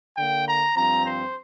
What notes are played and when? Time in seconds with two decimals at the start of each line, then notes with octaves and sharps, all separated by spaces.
0.17 D3 A#3 G5
0.46 A#5
0.76 G2 F3 C4 A#5
1.05 C5